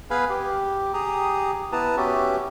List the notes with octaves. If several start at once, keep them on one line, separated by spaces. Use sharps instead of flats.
B3 G#4 B4 F5 G#5 B5
G4
G4 G#4 A#5 D#6
B3 E4 B4 A5 A#5 D#6
B3 C#4 F#4 G4 E5